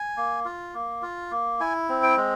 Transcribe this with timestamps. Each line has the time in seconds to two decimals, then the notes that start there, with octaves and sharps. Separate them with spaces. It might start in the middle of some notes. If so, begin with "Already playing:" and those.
Already playing: G#5
0.17 A#3
0.45 F4
0.74 A#3
1.03 F4
1.31 A#3
1.60 E4 G#5
1.89 C4
2.03 G5
2.17 G#3